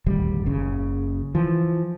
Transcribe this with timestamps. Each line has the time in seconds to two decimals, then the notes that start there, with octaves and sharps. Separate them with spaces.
0.06 D#1 G#1 D2 G3
0.46 F#1 C#3
1.35 E3 F3